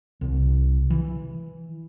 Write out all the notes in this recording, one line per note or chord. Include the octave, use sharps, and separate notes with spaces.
C2
E3